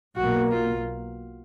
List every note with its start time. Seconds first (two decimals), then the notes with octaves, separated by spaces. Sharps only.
0.16 B1 B2 A#3 F#4
0.52 F4